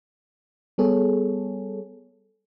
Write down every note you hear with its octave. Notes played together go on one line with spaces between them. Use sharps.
G3 B3 G#4 A4 C#5